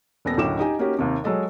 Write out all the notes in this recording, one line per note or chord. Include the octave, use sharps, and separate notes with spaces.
D#1 B3 A4 A#6
F#1 D2 A2 G5 D6 E7
D#4 G4 D#5 G#5
A#3 C#4 D#4 F#4 G4
D#2 C3
F#3 G#3 A4 D#5